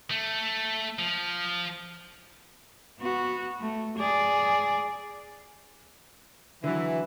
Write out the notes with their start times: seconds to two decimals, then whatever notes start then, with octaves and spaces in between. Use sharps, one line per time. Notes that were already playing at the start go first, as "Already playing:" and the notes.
0.11 A3
0.99 F3
2.99 B3 F#4
3.60 A3
3.97 G#4 D5
6.64 D3 E3 F#3